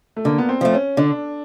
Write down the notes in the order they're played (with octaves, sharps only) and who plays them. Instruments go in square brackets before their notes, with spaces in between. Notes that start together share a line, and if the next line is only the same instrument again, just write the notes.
[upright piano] A3
[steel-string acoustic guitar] D3 [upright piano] A#3
[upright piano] B3
C4
[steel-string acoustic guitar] F3 A3
[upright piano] C#4
[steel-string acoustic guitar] D3 [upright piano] D4